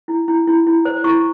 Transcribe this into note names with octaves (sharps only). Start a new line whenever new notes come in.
E4
E4
E4
E4
C5
E4 C#6